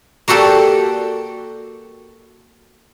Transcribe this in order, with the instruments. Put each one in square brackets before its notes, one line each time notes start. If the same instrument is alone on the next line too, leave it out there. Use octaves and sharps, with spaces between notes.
[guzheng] A#3 F#4 G4 A4 D5